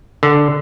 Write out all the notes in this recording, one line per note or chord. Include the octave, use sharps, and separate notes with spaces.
D3